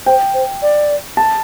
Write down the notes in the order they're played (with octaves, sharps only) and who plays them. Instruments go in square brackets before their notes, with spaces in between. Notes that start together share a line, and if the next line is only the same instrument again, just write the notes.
[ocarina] C5 [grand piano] G5
[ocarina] C5
D5
[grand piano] A5